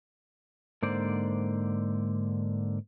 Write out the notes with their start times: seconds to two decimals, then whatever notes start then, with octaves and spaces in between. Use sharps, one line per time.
0.82 G#2 D3 A#3 C5 D5